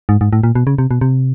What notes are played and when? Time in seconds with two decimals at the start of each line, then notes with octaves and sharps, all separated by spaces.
0.09 G#2
0.21 G#2
0.33 A2
0.43 A#2
0.55 B2
0.67 C#3
0.78 C3
0.91 B2
1.01 C3